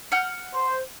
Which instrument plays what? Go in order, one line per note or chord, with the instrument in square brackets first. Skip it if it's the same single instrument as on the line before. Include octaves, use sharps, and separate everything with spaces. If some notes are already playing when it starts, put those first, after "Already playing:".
[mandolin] F#5 F6 G6
[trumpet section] C5